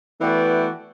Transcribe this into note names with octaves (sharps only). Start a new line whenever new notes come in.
E3 A3 B3 F#4 D5 G5